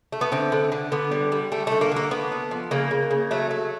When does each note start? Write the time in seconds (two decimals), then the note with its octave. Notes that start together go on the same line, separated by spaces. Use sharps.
0.12 A3
0.21 B3
0.32 D3 C4
0.52 D3
0.72 D3
0.92 D3 B3
1.11 G3
1.32 G3
1.52 G3 A3
1.67 D3 A3
1.81 A#3
1.92 D3 A#3
2.11 A3 B3
2.32 A3
2.51 F3
2.71 C#3 A#3
2.91 C#3
3.11 C#3
3.31 F#3 A3
3.51 A3